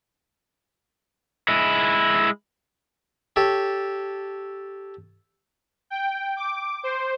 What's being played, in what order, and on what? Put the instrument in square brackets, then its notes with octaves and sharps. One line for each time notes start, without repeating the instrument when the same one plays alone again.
[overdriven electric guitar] G#3 E4
[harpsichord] G4 A4 C#5
[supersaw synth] G5
D6
C5